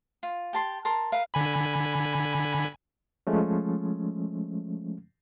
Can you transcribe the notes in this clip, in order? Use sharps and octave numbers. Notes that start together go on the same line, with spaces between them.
F4
G4 A5 C6
A#4 A5 C6
A#4 B4 E5 F5
D3 G#5 B5
F3 G#3 A3 C#4